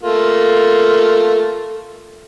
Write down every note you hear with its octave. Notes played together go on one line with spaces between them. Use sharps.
A3 A#3 F4